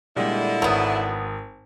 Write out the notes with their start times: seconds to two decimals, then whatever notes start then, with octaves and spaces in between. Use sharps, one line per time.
0.16 A#2 D3 G3 G#3 E4
0.62 G#1 F#3 B3 D#6